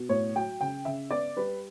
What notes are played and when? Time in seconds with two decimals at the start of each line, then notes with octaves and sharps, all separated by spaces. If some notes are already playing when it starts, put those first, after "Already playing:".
Already playing: B2
0.09 A2 C#5
0.35 F#3 G5
0.61 C#3 G5
0.85 C#3 E5
1.11 B3 D5
1.37 G3 B4